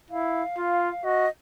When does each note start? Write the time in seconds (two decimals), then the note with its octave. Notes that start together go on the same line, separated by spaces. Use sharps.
0.11 E4 F5
0.57 F4
1.04 F#4 D#5